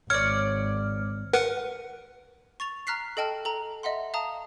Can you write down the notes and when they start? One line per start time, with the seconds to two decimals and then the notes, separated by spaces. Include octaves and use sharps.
0.10 G#1 C#5 D5 F6
1.33 A#4 B4 F#5
2.60 C#6 A6 F7
2.87 A#5 F6 F#6 B6 C7
3.17 A4 D#5 G5 A5 F6
3.45 A4 A#5
3.83 D#5 E5 F#5 C6
4.14 F5 A5 A#5 D#6